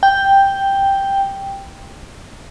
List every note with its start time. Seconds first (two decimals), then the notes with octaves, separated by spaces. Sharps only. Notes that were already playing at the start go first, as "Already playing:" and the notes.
0.03 G5